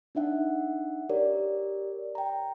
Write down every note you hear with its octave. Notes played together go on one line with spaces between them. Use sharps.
D4 D#4 E5 F#5
G4 A#4 C#5 D5
G5 A#5